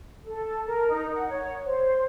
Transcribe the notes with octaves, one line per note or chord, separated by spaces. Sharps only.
A4
A#4
D#4
F#5
C#5
C5